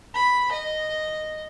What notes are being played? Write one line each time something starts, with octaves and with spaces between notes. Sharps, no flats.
B5
D#5